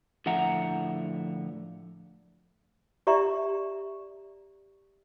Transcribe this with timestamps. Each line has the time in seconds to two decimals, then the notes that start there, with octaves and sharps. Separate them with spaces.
0.26 A2 D3 F3 E5 F#5 A#5
3.07 G4 D5 E5 A#5 C#6